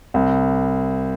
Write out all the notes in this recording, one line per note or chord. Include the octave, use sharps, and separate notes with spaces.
C2